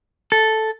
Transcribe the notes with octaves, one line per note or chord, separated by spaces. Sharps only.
A4